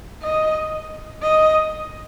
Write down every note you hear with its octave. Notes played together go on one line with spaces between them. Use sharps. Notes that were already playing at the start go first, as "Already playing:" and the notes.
D#5
D#5